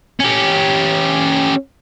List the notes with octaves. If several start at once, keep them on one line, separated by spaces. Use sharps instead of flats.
C#4 G4